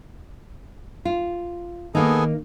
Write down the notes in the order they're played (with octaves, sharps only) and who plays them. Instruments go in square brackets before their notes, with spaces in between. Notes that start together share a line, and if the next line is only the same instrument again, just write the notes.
[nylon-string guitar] F4
[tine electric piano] D#3 [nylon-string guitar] A#3 D#4 [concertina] B3 G#4 A4